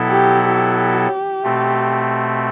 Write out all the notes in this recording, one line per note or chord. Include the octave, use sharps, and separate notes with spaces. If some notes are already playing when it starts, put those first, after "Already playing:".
Already playing: B2 F#3 B3 E4 A4
G4
G4
B2 A3 C4